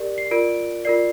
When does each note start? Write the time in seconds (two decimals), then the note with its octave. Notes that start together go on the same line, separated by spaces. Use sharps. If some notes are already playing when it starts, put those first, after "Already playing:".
Already playing: G4 A#4 D5
0.18 C7
0.31 F4 A#4 D5 D7
0.85 F4 A#4 D5 C7